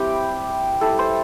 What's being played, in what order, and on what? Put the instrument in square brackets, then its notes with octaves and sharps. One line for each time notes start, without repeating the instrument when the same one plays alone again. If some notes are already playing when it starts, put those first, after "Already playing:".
Already playing: [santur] G3 C4 E4 G4
G3 E4 A4
C5